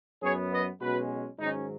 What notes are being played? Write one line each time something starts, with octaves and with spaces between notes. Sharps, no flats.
F#2 F#3 B3 G#4 C#5
B4 D#5
B1 B2 G#3 C#4 F#4 B4
G#2 D#3 F#3 C#4 D#4